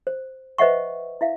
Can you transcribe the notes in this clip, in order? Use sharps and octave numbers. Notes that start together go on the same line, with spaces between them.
C5
B4 C5 D#5 E5 F#5 C#6
E4 E5 F5